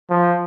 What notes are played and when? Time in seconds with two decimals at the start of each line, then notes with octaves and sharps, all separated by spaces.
0.10 F3